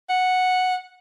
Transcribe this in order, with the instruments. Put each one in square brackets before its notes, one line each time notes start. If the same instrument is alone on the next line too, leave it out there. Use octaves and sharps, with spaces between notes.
[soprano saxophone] F#5